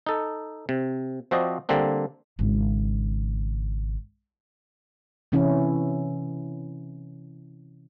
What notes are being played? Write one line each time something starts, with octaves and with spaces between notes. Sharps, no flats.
D#4 A4
C3
F3 C4 F#4 C5 D5 D#5
D3 G3 A#3 C4 D4
G#1 C#3
C3 E3 C#4 E4